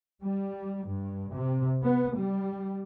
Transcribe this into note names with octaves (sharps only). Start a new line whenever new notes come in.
G3
G2
C3
B3
G3